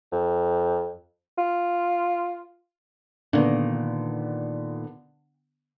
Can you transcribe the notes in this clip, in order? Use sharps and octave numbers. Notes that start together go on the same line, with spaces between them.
F2
F4
A#2 D3 D#3 B3